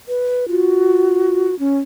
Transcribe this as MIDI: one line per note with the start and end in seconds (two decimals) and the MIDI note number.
0.08 0.48 71
0.48 1.47 65
0.48 1.55 66
1.59 1.78 61